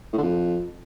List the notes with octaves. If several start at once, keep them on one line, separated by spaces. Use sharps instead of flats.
A2
D3
F2